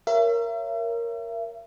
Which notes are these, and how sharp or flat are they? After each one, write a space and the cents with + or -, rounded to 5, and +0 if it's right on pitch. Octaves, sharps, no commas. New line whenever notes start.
A#4 +0 C#5 +0 E5 +40